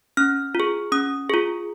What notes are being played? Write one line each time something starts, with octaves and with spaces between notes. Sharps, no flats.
C#4 F6
F4
G#4
C#4 D#6
F4 G#4